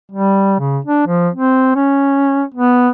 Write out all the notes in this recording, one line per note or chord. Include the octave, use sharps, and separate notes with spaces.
G3
C#3
D4
F3
C4
C#4
B3